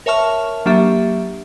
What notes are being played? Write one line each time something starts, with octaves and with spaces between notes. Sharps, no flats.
A#4 C#5 E5 A5 C#6 F6
F#3 A#3 D4 G4 E5